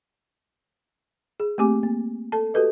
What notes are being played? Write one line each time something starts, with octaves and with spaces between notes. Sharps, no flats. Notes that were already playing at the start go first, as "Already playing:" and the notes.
G#4
A3 A#3 C4 G4 G#5 D6
A#3
A4 A5
F#4 G4 A4 B4 D#5